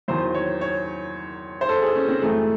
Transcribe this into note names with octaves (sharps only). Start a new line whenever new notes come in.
E2 D#3 F#3 C5
C#5
C#5
C5
A4
G#4
C#4
C4
F#2 E3 G#3 A3